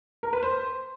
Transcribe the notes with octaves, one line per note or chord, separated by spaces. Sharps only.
A#4
B4
C5